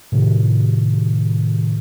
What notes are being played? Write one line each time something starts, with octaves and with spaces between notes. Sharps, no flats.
A2 C3 D#3